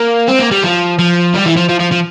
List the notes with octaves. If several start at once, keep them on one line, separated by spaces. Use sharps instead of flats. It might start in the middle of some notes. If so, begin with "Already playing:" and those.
Already playing: A#3
C4
A#3
G3
F3
F3
G3
E3
F3
F3
F3
F3